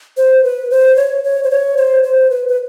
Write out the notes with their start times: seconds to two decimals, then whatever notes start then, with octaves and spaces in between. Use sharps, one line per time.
0.17 C5
0.44 B4
0.70 C5
0.96 C#5
1.23 C#5
1.43 C5
1.51 C#5
1.77 C5
2.03 C5
2.30 B4
2.48 B4